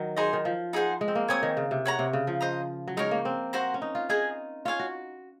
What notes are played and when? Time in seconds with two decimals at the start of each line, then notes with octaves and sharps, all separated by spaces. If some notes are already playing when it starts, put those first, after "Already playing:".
Already playing: D#3 F#3
0.16 D#4 G#4 C5 D#5
0.33 D#3
0.45 F3
0.73 D#4 G#4 C5 F#5
1.01 G#3
1.08 C4
1.15 A#3
1.29 C4 C#5 G#5 D#6
1.43 D#3
1.57 C#3
1.71 C3
1.86 C#5 F#5 A#5
1.99 C3
2.13 C#3
2.27 F3
2.41 C5 D#5 A#5
2.88 F#3
2.97 G#3 D#4 A#4 C#5
3.11 A#3
3.25 C4
3.53 F#4 C5 F#5 A#5
3.74 C#4
3.82 D#4
3.95 F4
4.09 D#4 G#4 D#5 G#5
4.65 F4 C#5 F5 G#5
4.79 F#4